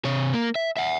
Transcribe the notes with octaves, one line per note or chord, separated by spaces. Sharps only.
C3 C#5
A#3
E5
E5 F#5